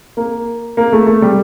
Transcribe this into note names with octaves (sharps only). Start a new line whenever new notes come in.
A#3
A#3
A3
A3
G3